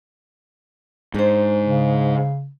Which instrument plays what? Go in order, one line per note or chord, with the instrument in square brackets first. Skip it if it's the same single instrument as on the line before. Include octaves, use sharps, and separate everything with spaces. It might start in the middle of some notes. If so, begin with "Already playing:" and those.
[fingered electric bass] G#2 [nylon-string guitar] D4 C5
[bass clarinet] C#3